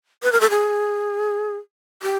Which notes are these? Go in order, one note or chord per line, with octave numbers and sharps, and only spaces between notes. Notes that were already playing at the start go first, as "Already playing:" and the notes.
B4
A#4
A4
G#4
G4